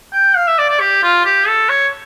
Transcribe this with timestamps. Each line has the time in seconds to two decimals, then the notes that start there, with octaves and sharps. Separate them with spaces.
0.13 G5
0.36 F5
0.47 E5
0.58 D5
0.69 D5
0.80 G4
1.03 F4
1.25 G4
1.47 A4
1.69 C#5